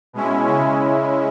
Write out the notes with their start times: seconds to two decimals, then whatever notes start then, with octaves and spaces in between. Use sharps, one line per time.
0.13 B2 G#3 C#4 E4
0.46 C#3 G#3 C#4 E4